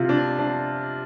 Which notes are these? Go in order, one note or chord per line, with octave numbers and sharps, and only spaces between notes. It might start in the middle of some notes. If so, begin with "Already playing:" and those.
Already playing: C3 F4
D4
D4